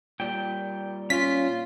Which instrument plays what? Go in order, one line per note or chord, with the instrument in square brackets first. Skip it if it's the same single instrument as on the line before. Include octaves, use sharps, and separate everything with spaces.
[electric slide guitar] A#2 G3 [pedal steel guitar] G5
[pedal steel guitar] C#4 [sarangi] F4 [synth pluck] B6